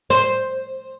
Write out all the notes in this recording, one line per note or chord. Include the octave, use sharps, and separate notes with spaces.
C5